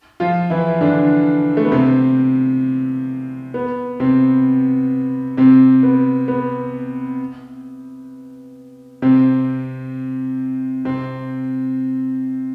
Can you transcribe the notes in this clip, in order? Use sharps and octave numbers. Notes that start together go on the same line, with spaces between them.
F3 F4
E3 E4
D3 D4
A3
B3
C3 C4
B3
C3 C4
C3 C4
B3
B3
C3 C4
C3 C4